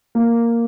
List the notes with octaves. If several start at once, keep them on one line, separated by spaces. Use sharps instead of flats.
A#3